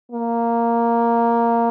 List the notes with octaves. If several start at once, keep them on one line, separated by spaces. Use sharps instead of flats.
A#3